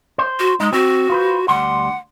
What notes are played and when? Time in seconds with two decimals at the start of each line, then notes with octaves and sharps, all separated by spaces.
0.18 C5
0.40 F#4
0.60 G#3 D#4
0.73 C4 F#4
1.10 F4 B4 C5
1.48 D2 G3 F#5 C6